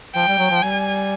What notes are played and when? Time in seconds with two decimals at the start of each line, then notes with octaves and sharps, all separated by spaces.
0.16 F3 G5
0.28 G3
0.38 F#3
0.50 F3
0.62 G3 G#5